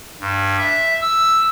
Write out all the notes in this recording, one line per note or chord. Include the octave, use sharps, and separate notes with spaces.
G2
E5
E6